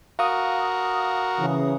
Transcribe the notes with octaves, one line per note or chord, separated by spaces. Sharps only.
F#4 A#4 F5 D#6
C#3 E3